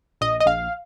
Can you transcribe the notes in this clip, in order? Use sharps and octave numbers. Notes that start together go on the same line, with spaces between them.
A#1 D#5
D#5
A#1 F5